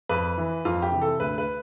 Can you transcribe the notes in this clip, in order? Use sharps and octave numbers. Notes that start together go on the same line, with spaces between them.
F2 B4
E3
F2 F4
G4
C3 E3
A4
D2 B4
B4